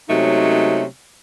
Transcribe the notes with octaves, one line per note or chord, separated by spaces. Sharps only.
C3 F#3 G#3 A3 C#4 D#4